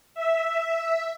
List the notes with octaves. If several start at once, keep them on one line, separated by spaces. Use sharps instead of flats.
E5